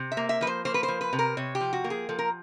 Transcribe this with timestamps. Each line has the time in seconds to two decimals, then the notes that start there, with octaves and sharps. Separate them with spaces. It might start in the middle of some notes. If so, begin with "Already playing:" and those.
Already playing: C3
0.12 E5
0.17 A#3
0.29 E5
0.41 F3 B4
0.47 C5
0.65 A#3 C5
0.74 B4
0.83 C5
0.88 F3
1.01 B4
1.13 C3
1.19 A#4
1.37 C3 C#5
1.55 G4
1.61 F3
1.73 F#4
1.84 A#3
1.90 G#4
2.09 F3 A4
2.19 A#4